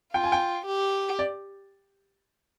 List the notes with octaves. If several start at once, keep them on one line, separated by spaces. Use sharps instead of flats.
F4 G5
G#5
G5
G4
D5